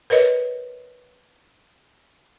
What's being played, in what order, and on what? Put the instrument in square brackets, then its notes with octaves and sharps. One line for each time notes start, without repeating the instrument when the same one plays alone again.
[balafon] A#4 B4 C#5 D#5